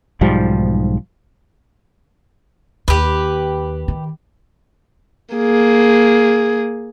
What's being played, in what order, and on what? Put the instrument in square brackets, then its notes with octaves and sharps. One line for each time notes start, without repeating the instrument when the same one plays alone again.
[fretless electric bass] B1 G#2 F3 G3
[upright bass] D#2 [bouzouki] G4 B4
[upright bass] D#3
[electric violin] A#3 G#4